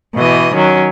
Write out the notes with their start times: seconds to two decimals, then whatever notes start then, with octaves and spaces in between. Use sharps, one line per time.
0.16 B2 E3 D#5
0.54 D#3 F#3 C#4